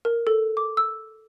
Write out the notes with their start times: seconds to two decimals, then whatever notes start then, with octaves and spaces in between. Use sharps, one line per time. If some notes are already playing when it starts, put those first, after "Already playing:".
0.05 A#4
0.27 A4
0.57 D6
0.77 E6